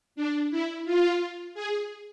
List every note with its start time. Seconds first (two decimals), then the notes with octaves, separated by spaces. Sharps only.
0.16 D4
0.50 E4
0.85 F4
1.54 G#4